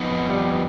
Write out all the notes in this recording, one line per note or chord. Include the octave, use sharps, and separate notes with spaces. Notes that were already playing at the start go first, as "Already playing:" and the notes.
Already playing: F2 B3 D#4 B4
G3